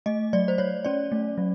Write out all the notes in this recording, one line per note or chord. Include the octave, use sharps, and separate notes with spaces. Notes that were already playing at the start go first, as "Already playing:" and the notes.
A3 D#5
F#3 D5
C5
F#3 C#5
C#4 D5
A3
F#3